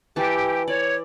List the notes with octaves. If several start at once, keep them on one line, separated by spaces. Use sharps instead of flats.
E3 G4 A5
C#5 D5